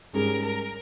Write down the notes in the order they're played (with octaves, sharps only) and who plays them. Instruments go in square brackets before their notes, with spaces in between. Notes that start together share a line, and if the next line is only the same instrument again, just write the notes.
[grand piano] G#2 G3 C#4 G#4 [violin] A#4
[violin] A#4